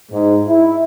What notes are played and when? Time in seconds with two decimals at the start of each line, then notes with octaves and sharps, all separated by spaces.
0.12 G#2
0.48 E4